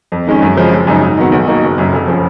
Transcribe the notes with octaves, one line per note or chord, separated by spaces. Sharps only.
F2
D#3 G#3 C#4
F#2
C#3 F3 G#3
F#1
F#2 C#3 G#3 D#4
G#2
D#3 F#3 B3
B1
B2 A#3 D#4
F#1
F#2 C#3
F1
C#3 F3